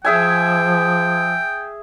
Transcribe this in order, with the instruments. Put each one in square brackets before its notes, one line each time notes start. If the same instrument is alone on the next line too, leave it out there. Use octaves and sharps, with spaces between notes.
[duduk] F3 [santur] G#4 E5 G#5 [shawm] G5